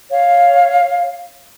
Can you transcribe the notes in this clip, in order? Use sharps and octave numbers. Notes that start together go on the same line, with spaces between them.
C#5 F5